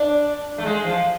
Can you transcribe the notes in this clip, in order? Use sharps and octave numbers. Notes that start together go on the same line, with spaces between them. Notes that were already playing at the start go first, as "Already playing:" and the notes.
Already playing: D4
A3
G#3
F3